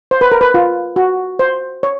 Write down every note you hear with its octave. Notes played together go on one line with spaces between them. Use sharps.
C5
B4
A#4
B4
F4
F#4
C5
C#5